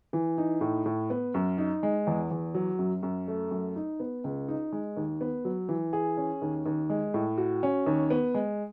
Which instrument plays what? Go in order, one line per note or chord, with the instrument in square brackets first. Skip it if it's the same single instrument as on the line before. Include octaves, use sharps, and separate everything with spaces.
[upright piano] E3
D#4
A2
A2
B3
F#2
D#4
G#3
E2
E2
F#3
F#2
F#2
A3
F#2
D#4
B3
C#2
D#4
G#3
D#2
B3
F#3
E3
G#4
C#4
D#2
D#2
G#3
A2
F#4
C#4
D#2
B3
G#3